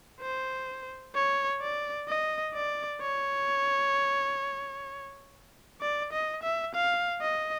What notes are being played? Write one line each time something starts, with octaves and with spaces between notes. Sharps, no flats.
C5
C#5
D5
D#5
D5
C#5
D5
D#5
E5
F5
D#5